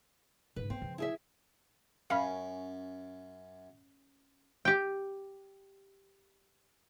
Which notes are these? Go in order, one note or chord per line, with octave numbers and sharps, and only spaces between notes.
G#2 C#3 B4
B3 C4
C#3 F3
E4 G#4 E5
F#2 C#4 F5 B5
G4 G5